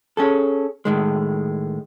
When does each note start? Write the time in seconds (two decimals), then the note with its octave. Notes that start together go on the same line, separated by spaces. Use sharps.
0.17 C#4 G#4 A4
0.85 A2 D#3 G#3